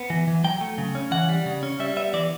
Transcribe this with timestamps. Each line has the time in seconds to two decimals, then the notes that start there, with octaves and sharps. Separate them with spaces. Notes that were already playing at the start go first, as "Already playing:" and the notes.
Already playing: B3
0.10 E3
0.28 E3
0.44 F#3 G5
0.61 A3
0.78 C#3
0.95 C#4
1.11 E3 F#5
1.29 G3
1.46 C#3
1.63 C#4
1.80 G3 E5
1.97 B3 E5
2.13 E3 D5